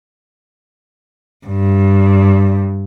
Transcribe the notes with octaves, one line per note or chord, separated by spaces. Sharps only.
G2